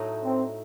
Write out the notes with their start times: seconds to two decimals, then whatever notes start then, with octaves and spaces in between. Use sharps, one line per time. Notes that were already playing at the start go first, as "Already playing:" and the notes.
Already playing: A2 F#3 A3 D#4
0.22 C4